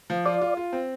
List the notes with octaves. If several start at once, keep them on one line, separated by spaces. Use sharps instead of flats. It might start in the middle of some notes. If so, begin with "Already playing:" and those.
F3
F4 D5
F4
F4
C4